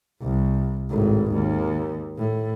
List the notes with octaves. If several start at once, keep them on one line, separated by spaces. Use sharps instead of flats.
C2
G#1 A2
D#2
A2